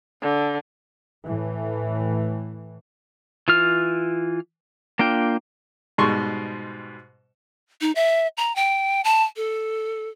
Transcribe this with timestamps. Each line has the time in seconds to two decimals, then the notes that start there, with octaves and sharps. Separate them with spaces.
0.22 D3
1.24 A2 E3
3.48 E3 F4 F6
4.99 A#3 D4 F4 G5
5.98 G#2 B2 G3 C6 C#6
7.81 D#4
7.95 E5
8.37 A#5
8.56 G5
9.04 A5
9.36 A4